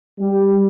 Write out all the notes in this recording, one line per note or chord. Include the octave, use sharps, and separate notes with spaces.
G3